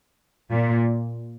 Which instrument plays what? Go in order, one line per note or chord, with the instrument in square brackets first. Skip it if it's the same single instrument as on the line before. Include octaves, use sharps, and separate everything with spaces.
[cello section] A#2